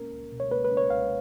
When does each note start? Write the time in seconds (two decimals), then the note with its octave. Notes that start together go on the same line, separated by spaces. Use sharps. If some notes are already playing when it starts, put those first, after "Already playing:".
Already playing: A#3 C#4 A#4
0.12 C#2
0.32 B2
0.40 C#5
0.51 A#3 B4
0.64 B4
0.71 C#4
0.77 C#5
0.90 C#2 F5